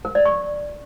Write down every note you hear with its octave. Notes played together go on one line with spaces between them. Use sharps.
A#4
D5
C#6